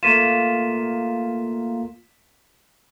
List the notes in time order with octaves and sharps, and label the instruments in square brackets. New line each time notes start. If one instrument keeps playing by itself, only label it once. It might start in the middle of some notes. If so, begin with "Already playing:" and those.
[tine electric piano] A3 A#3 F4 [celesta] B6 D#7 E7